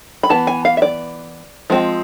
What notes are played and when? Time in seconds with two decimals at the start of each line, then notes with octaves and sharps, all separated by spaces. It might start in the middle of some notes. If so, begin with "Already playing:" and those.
0.23 B5
0.29 E3 B3 A5
0.47 G#5
0.65 F5
0.77 E5
0.82 D5
1.70 F3 G#3 C4